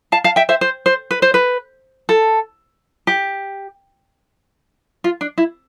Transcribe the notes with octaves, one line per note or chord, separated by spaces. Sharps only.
F5 A5
F5 A5
E5 G5
C5 E5
C5
C5
B4
C5
B4
A4
G4
F4
D4
E4